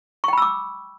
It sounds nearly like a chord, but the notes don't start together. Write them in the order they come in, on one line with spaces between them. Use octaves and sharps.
C#6 G5 B5 E6 D6